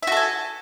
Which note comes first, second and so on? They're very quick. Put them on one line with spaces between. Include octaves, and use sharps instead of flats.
E5 F#4 A4 G#5